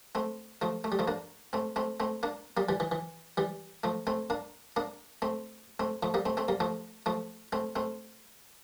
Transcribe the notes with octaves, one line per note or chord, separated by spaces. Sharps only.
A3 C4
F3 A3
A3
G3
F3 A3
A#3 D4
A3 C4
A3 C4
A3 C4
A#3 D4
G3 A#3
E3 G3
E3
E3
E3 G3
F3 A3
A3 C4
A#3 D4
A#3 D4
A3 C4
A3 C4
F3 A3
G3 A#3
A3 C4
A3 C4
G3 A#3
F3 A3
F3 A3
A3 C4
A3 C4